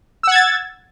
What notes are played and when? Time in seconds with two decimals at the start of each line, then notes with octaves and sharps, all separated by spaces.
0.23 E6
0.27 F#5
0.31 G#6
0.35 A6